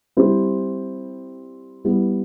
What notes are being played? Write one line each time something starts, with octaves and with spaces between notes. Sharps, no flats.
G3 C4 E4 G4
G3 B3 E4